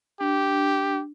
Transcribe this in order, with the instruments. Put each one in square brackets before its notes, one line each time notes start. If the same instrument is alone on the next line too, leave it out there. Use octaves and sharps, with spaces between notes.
[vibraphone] D4 [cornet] G4